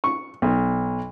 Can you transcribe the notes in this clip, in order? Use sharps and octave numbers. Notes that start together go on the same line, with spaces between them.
C#6
B1